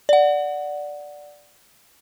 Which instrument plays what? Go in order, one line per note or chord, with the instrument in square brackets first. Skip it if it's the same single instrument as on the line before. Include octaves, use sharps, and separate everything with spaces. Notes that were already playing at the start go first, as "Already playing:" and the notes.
[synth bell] D5 F#5